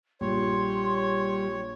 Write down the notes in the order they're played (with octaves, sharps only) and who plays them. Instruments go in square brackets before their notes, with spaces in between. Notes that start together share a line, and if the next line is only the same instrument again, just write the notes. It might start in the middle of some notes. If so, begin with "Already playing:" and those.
[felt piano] A#1 [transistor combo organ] G3 [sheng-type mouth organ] C#5 [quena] C6